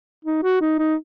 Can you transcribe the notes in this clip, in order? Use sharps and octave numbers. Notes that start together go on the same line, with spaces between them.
D#4
F#4
D#4
D#4